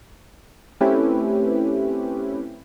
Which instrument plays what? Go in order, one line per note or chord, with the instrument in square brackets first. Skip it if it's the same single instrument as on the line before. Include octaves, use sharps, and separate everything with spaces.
[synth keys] A3 C4 C#4 E4 G4 B4